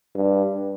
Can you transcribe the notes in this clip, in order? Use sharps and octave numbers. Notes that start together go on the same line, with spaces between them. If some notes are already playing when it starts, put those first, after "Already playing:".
G2